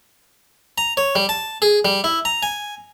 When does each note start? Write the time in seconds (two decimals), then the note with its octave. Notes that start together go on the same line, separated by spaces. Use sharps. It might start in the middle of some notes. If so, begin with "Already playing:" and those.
0.78 A#5
0.97 C#5
1.15 G3
1.29 A5
1.62 G#4
1.85 G3
2.04 E4
2.25 A#5
2.43 G#5